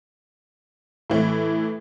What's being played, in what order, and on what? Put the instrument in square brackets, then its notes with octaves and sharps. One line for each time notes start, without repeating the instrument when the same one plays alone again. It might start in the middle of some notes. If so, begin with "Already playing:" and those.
[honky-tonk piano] A2 E3